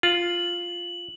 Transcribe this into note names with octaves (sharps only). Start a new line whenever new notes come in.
F4 F#7